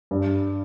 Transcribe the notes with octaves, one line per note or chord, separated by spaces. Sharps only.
G2